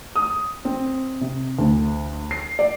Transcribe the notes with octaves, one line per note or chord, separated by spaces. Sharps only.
D#6
C4
C3
D2
C7
D5